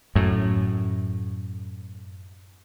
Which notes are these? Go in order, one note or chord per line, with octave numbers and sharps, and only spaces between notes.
F#2 A2